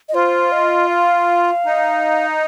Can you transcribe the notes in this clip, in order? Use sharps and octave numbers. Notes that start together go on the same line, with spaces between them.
D#5
F4 C5
D#5
F5
D#4